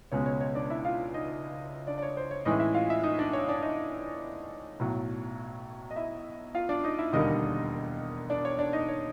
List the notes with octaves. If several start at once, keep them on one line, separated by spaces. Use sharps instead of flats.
C#2 B2 G#3 C#4 C#5
C#5
C#5
D4 D5
E4 E5
F4 F5
D#4 D#5
D4 D5
D5
C#5
C5
C#5
A2 E3 G#3 C#4 D#4 E4 D#5
E4 E5
F4 F5
E4 E5
D#4 D#5
D4 D5
C#5
D4 D5
D#4 D#5
B1 A2 F#3
D#5
E4 E5
F4 F5
D4 D5
D#4 D#5
E4 E5
E1 D#2 D3 G3 A#3 D#4 D#5
D4 D5
C#5
D4 D5
D#4 D#5
C#5